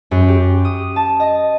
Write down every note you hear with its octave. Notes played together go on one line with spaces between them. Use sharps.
F#2
G4
D#6
A5
D#5